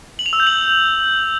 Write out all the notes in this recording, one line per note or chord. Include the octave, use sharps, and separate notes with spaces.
F#7
F7
E6
G6
F#7